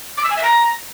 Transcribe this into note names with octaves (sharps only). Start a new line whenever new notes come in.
D6
E6
G#5
E5
A#5